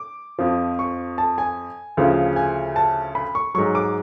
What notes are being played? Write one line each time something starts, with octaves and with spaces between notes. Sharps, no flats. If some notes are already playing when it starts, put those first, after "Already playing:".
Already playing: D6
F2 F3
C#6
A5
G#5
D2 C#3 F3
G#5
A5
B5
C#6
G#2 F#3 C#6
D6